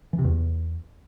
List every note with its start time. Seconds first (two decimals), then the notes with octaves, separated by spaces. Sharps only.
0.13 E3
0.19 C3
0.24 E2